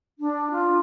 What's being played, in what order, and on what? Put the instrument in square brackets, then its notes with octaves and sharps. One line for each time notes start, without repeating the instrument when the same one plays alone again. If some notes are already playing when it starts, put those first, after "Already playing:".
[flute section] D4
F4